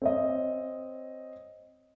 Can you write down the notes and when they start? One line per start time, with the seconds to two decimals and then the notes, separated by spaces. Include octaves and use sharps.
0.02 C4 C#5 D#5